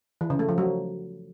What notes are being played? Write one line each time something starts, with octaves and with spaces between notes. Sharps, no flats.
E3
C#3
A3
F3
F#3